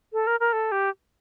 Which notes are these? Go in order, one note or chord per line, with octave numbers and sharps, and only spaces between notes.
A4
A#4
A#4
A4
G4